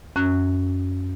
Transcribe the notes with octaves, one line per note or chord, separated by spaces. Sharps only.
F#2 C#4 F#6